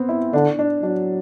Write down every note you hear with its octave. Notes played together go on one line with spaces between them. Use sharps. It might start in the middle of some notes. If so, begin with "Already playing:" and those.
Already playing: B3 C4
E4
D3 D4
D4
F#3 D4